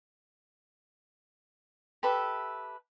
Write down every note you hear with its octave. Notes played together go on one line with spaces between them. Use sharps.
G4 A4 B4 E5